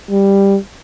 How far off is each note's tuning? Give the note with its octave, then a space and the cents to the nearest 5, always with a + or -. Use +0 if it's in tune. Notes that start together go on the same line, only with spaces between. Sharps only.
G3 +10